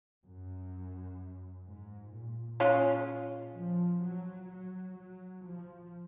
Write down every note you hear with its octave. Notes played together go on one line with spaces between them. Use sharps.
F#2
G#2
A#2
G#3 C#4 F4
F3
F#3
F#3
F#3
F3